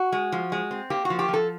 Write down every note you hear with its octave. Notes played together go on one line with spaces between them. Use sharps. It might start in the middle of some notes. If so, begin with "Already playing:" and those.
Already playing: F#4
G#3
F3
G#3
C4
A#3 G4
F#4
F3
G4
F3
A4